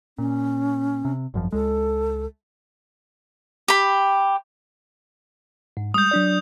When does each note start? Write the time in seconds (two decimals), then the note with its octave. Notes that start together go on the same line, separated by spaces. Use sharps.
0.18 A#2 C#4
1.05 C3
1.34 G#1 F#2 F3
1.52 C#2 G#3 A4
3.68 G4 B5
5.77 G#2
5.94 G3 G#3 D#6 G6
6.11 F#3 D4 D5